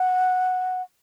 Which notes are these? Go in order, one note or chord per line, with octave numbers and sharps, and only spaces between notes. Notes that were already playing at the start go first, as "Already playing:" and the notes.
Already playing: F#5